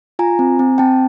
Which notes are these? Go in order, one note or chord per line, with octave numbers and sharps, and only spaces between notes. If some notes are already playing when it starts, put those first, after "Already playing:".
F4 G#5 A#5
C4
C4
C4 G5 A5